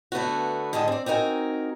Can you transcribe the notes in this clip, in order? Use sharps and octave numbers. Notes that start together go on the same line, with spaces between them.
D3 A3 B3 F#4
G#2 D3 G4 G#4 D#5 A5
C4 D5
C4 D#4 F#4 A#4 G#5